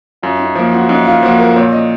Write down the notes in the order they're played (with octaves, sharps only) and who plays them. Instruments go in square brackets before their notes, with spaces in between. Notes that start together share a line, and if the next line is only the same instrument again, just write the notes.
[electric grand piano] F#2 [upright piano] F4
[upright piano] D#4
[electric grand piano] F3 A#3 [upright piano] F4
[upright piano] F#4
[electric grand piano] F#2 [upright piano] D#4
[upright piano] F4
[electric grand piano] F3 A#3 [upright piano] F#4
[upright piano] A#4
[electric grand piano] A#2 [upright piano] C#5
[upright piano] D#5